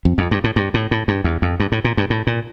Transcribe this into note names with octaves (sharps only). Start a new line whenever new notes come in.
F2
F2
G2
A2
G2
A2
A2
G2
E2
F2
G2
A2
A#2
G2
A2
A#2